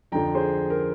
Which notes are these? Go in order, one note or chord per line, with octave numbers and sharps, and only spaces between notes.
F2 D3 F3 G5 A#5
G#4 C5
A#4